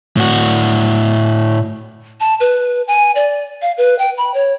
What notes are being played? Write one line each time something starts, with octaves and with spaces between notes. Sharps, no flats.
A2 F#4
A5
B4
G#5
D5
F5
B4
G5
B5
C#5